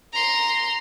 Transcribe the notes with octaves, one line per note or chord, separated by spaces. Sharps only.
A#5 C6